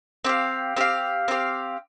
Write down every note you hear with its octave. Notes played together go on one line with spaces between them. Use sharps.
C4 G4 F5
C4 G4 F5
C4 G4 F5